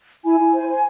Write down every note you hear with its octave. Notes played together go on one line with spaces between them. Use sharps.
E4 G#5
E4
C5
C5